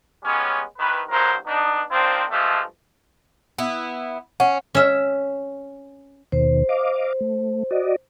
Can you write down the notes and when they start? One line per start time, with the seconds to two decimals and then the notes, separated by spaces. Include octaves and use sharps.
0.24 G3 G#3 B3 C#4
0.78 C2 D#3 B4
1.10 E2 G2 F#3 A#4 C5
1.46 B3 D4 D#4
1.91 D#3 C4 D4 F4 C5
2.30 G2 F3 G#3 A3
3.58 B3 E4
4.40 C#4 F#5
4.75 C#4 E5
6.32 D#2 B2 D#3 C5
6.69 D#5 F5 D6
7.21 A3
7.71 F#4 D5 D#5